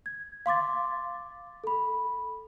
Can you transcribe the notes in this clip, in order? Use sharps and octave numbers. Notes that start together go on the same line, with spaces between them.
G#6
F5 C6 D6 A6
A4 B5